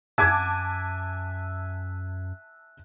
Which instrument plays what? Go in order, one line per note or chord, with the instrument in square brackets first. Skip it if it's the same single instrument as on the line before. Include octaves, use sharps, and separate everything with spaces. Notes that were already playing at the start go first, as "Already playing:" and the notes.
[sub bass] F#2 [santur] E5 G#5 [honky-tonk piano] A5 D6 G#6 [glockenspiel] F#6